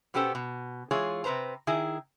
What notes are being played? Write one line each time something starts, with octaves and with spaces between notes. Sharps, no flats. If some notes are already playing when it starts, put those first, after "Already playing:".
B2 B3 C#4 G4 A4 C5
B2
E3 G#3 F4 G#4 C#5
C3 F#3 B4 C5 A#5
D#3 E4 G#4